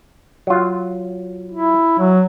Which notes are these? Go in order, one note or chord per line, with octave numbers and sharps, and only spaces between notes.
F#3 F4
E4
F#3